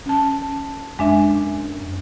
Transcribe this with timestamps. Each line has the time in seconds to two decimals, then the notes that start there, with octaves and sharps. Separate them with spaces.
0.06 C#4 A5
0.99 F#2 G#3 D4 E5